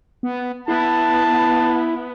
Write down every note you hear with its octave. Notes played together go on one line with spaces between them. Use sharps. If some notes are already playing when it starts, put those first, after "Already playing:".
B3
B3 E4 A5